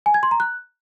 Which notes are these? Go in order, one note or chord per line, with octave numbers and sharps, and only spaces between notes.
G#5
G#6
C6
A#5
F#6